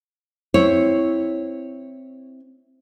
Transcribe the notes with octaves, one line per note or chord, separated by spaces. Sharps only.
C4 E4 C#5